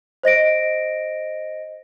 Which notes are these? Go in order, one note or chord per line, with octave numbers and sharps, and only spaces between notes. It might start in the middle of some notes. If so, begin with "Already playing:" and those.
C5 D#5 A#6 D7